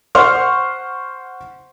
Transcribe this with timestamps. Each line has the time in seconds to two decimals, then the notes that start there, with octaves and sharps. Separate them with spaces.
0.15 C5 F#5 C6 C#6 F6